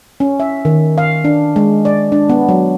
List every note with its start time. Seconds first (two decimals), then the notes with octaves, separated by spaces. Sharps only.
0.20 C#4
0.40 E5
0.65 D#3
0.98 F5
1.24 D4
1.56 G#3
1.85 D5
2.12 D4
2.29 B3
2.49 F#3